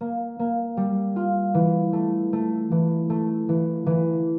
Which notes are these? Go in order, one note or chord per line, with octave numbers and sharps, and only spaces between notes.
A#3
A#3
G3
F4
E3
A3
A3
E3
A3
E3
E3